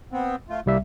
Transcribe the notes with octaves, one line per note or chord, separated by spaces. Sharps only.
B3 C4
A3 F4
C2 G3 A#3 E5